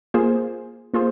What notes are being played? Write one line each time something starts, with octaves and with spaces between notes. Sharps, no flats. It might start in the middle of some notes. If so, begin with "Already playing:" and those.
A#3 F4 G#4 C5
A#3 F4 G#4 C5